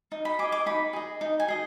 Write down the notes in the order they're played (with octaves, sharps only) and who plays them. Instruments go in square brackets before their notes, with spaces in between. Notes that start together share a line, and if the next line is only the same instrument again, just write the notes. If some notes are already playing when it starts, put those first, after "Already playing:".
[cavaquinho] D#4
B5
G#4 D6
D#5
D6
D#4 B5
G#4 D#5
D#4
G#5
G#4 D#5